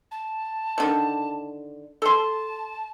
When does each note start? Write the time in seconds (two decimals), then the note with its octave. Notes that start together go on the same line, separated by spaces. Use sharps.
0.11 A5
0.78 B2 D3 D#3
2.02 A4 A5 C6